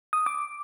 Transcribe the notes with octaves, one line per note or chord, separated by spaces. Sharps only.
D#6
D6